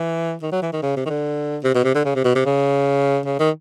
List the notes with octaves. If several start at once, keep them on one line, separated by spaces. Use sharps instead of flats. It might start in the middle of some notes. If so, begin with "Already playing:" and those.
Already playing: E3
D#3
F#3
E3
D#3
C#3
C3
D#3
D3
C3
B2
C3
D3
C#3
C3
B2
C3
C#3
C#3
D#3